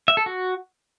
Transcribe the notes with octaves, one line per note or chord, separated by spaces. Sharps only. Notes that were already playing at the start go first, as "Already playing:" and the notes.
E5
A4
F#4